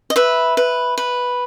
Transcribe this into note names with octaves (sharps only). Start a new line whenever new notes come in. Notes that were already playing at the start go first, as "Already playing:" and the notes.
D#5
B4 E5
B4
B4